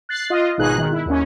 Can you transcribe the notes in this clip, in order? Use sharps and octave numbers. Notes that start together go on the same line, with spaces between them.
F#6 A6 C7
F4 D#5
G#1 B2 D#4 G#4 F#6
D#3
E4
D#2 C#4